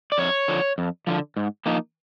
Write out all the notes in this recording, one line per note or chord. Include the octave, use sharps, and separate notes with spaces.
D5
F2 C#5
D3 F3
F2
D3 F3
G#2
F3 A#3 D#4